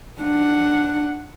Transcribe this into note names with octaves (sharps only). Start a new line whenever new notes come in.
D4 F#5